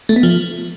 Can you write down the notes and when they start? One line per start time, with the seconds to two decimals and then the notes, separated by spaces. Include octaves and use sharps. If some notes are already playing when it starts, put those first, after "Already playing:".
0.09 A3
0.16 B3
0.23 F3